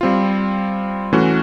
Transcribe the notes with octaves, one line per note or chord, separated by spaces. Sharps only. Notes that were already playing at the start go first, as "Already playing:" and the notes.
G3 C4 F4
E3 A3 C#4 F#4